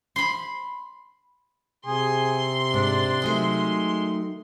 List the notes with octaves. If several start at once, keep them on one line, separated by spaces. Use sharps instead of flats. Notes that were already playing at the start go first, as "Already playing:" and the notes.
B5 C6
C3 G#4 C6
G#2 D4
D#3 F#3 G#3 A3